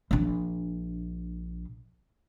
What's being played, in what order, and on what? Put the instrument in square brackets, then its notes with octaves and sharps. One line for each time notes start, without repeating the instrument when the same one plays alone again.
[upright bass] A#1 D4